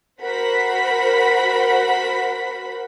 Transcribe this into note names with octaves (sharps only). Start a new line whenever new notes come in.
F#4 A#4 C5 F#5 B5 B6